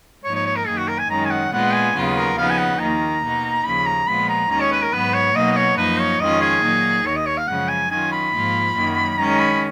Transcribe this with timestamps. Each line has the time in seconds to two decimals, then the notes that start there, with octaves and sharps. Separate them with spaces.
0.24 G#2 F3 A#3 D#4 C#5
0.35 C#5
0.46 C#5
0.56 A#4
0.67 F#2 D#3 A#3 G#4
0.78 F#4
0.88 A#4
0.99 G#5
1.09 F#2 D#3 G#3 C#4 A#5
1.25 G#5
1.31 F#5
1.53 A#2 G#3 B3 F4 F#5
1.74 G#5
1.96 D#2 C#3 F#3 B3 F4
2.17 A#4
2.38 C#3 F3 B3 D#4 F5
2.50 G#5
2.59 F#5
2.80 D#2 D#3 A#3 A#5
3.23 B2 A#3 D#4
3.65 D#2 C#3 F3 A#3 B5
3.87 A#5
4.07 A#2 F3 G#3 B3 F4 B5
4.29 A#5
4.50 D#2 D#3 G#3 C#4 A#5
4.61 C#5
4.72 B4
4.83 A#4
4.93 G#2 F#3 B3 B4
5.14 C#5
5.35 B2 F#3 A#3 D#4 D#5
5.52 D#5
5.57 C#5
5.77 F#2 F3 A#3 D#4 B4
6.00 C#5
6.20 F2 D#3 G#3 C#4 F4 D#5
6.41 G#4
6.64 A#2 F#3 A#3 D#4
7.06 D#2 D#3 A#3 C#5
7.16 D#5
7.26 C#5
7.37 F5
7.48 F#2 C#3 F3 G#3 F#5
7.69 G#5
7.91 D#3 F#3 C#4 F4 G#5
8.13 B5
8.33 G#2 F3 A#3 F4
8.76 F#2 D#3 F#3 A#3
9.18 D#3 G#3 C#4 A#5
9.39 B5